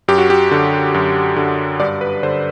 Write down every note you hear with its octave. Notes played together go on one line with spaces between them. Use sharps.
F#2 G4
F#4
G4
D3
F#2
D3
G2 D5
B4
D3 C5